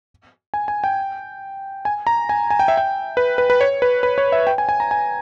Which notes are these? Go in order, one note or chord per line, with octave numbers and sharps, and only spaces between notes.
G#5
G#5
G5
G#5
A#5
G#5
G#5
G5
E5
G5
B4
B4
B4
C#5
B4
B4
C#5
E5
G5
G#5
G#5
A#5
G#5